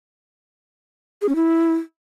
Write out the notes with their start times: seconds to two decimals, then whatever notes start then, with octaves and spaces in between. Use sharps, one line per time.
1.22 G#4
1.29 C#4
1.36 E4